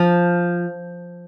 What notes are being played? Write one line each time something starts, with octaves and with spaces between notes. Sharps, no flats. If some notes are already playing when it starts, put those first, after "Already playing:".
Already playing: F3